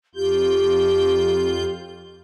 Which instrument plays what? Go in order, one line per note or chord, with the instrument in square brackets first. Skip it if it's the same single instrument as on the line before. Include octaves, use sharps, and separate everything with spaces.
[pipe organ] F2 F4 G6 [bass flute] G4